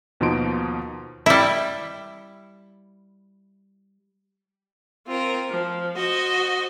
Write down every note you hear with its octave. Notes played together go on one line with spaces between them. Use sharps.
D#2 B2 F3 D#4 C6 D7
G3 E4
C4 F4 A#4
F3
F#4 C5 D#5